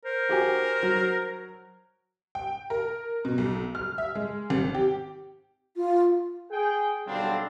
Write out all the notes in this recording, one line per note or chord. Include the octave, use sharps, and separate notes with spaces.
A#4 C5
F#4 G4 G#5
F#3
G5
A#4
B2
B1
F6
E5
G#3
G#1
G4
F4
G#4 G5
B1 D3 G3 C4 D4 F5